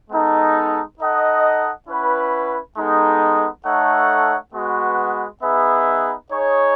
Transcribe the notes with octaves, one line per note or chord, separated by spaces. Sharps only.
G#3 B3 D#4 A4
D#4 A4 D#5 F#5
C#4 E4 B4 F#5
G#3 B3 D#4 A4
A3 D#4 A4 C#5 F#5
G#3 B3 F#4 B4
B3 D#4 G#4 B4 E5
D#4 G#4 C#5